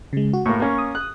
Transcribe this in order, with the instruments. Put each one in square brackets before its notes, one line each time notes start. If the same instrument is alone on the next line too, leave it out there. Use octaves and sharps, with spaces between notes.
[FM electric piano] C#3 G#3
F#4
[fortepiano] A2 A#3 [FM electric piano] C#6
[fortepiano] A#3 C#4
[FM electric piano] D#6
[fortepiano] F#6